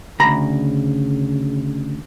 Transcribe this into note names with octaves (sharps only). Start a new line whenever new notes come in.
D2 C#3 A#5 B5